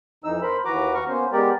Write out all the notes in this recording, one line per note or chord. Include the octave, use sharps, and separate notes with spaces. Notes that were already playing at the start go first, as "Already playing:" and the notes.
F2 E3 D#4 E6
A#4 C5 B5
D#2 E3 F#4 B4 A#5 D6
F#4 A#5 C#6 F6
A#3 B3 C#4 C5
G#3 B3 G4 A#4 D5